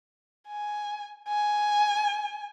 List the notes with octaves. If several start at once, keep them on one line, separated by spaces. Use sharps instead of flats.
G#5
G#5